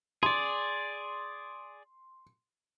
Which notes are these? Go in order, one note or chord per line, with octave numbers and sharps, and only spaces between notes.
G#4 D5 C6